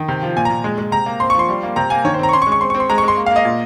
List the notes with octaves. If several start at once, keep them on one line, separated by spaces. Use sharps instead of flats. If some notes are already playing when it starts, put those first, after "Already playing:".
Already playing: D#3
C3
F3
A#2 G#5
A#5
A#2
G#3
G#3
C3 A#5
A#3
C4 C6
C#6
F3 C6
G3
A#3
C3 A#5
A#3 G#5
D#3 C#5
C5
C4 A#5
C#6
C#4 C6
C#6
G#3
C#6
C4 C6
C#6
C4
C6
G#3 A#5
C#6
G#3
C6
A#3
F5
A#3
D#5
A#2